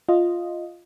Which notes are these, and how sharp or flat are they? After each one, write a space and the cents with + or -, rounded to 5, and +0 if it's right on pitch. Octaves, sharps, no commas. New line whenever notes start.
F4 +0 D#5 +0